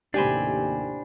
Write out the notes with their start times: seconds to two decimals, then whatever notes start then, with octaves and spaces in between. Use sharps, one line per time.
0.14 D#2 A2 C3 D4 G4 C5 G#5 B5